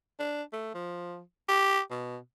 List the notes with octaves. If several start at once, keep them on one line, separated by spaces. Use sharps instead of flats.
D4
A3
F3
G4
B2